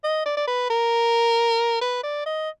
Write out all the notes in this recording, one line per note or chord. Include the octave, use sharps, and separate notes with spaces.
D#5
D5
D5
B4
A#4
B4
D5
D#5